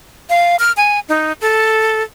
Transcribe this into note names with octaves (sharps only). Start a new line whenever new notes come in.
F5
F6
G#5
D#4
A4